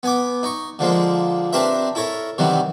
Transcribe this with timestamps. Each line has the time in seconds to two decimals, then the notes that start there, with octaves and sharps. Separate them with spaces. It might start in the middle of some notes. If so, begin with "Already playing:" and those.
0.03 B3 G#5 D6
0.43 D#4 C#6
0.79 D3 F3 G#3 A#3
1.53 C4 D4 G4 A#4 B4 E5
1.95 E4 A4 A#4 C#5
2.38 C3 D#3 E3 F#3 G3